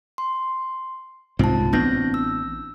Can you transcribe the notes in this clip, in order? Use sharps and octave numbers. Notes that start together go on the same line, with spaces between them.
C6
C2 G#2 C4 F4 A5
A1 B3 C4 D4 G6 A#6
E6